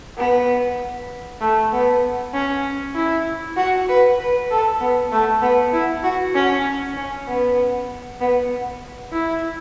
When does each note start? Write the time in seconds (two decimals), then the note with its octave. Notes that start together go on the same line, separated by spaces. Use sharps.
0.17 B3
1.40 A3
1.72 B3
2.33 C#4
2.95 E4
3.56 F#4
3.88 B4
4.18 B4
4.50 A4
4.80 B3
5.12 A3
5.42 B3
5.72 E4
6.03 F#4
6.35 C#4
6.97 C#4
7.28 B3
8.21 B3
9.12 E4